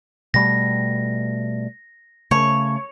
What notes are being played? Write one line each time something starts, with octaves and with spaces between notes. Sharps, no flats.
B2 G3 A3 A#6
C#3 A3 C#5